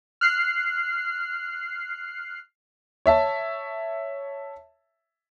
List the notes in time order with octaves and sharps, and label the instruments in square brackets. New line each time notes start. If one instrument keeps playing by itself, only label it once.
[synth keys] F6 F#6 C7
[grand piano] C#5 E5 A5